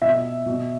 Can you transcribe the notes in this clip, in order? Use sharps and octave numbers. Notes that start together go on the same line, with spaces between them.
B2 E5
B2